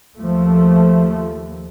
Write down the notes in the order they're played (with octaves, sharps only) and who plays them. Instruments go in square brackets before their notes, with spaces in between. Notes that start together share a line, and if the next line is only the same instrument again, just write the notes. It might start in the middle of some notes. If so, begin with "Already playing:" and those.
[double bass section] D#2 F3 A3